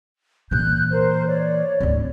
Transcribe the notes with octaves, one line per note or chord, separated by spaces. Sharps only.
A#2 E3 F#6 G6
A#4 C5
C#5 D5
G#1 D2